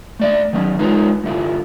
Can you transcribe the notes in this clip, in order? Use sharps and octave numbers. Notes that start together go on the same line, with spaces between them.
A3 D5 E5
D#3 F#3 C#4
G#3 D#4 F4 B4 C#5
G2 D3 E4 F4